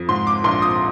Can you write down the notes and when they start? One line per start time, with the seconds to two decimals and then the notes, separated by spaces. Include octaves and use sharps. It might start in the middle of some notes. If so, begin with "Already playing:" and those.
Already playing: F2
0.09 G#2 C6
0.27 D6
0.44 A#1 C6
0.62 D#6